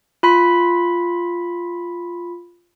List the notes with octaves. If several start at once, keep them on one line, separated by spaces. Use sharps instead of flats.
F4 B5 B6